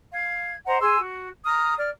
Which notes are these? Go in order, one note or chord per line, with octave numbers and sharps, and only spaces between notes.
F5 G#6
C5 D#5 F#5 A#5
G#4 G#5 C6 E6
F#4
A#5 D#6 F6
D5 F6